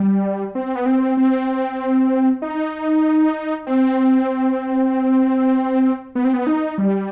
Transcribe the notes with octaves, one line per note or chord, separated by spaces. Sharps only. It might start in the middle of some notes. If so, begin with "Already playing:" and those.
Already playing: G3
C4
B3
C4
C4
D#4
C4
B3
C4
B3
D#4
G3